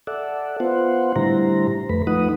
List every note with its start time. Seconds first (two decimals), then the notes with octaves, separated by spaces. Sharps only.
0.07 A4 D5 E5 F#5
0.60 B3 F4 C5 F#5
1.16 A2 D3 G3 E4 C5 A#5
1.89 F2 A3 B4 B5
2.07 F3 A3 D#4 B4 F#5 D#6